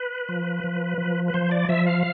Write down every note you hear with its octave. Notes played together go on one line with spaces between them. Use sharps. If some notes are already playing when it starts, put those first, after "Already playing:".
Already playing: B4
F3
F3
F3
B4
F3 C5
D5
F3 E5
F5